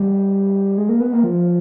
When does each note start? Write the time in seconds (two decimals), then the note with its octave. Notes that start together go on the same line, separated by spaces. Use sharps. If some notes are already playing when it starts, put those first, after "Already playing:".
Already playing: G3
0.78 G#3
0.89 A#3
1.00 B3
1.13 A#3
1.24 F3